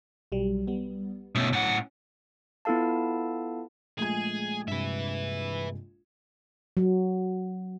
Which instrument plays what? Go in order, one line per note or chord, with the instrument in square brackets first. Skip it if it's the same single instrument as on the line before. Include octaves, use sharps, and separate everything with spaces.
[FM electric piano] B1 F#3 G3
G3 B3
[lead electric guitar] B2 A3 [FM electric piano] C#4
[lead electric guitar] A2 F#5
[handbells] B3 E4 F4 A4 F5 A5
[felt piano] A#1 G#3 G#6 [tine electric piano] A3 [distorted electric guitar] G#4
[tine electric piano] G2 C3 [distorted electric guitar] B4 E5
[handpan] F#3